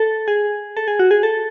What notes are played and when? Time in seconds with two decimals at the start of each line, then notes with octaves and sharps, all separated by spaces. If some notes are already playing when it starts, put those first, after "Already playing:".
Already playing: A4
0.28 G#4
0.77 A4
0.88 G#4
0.99 F#4
1.11 G#4
1.23 A4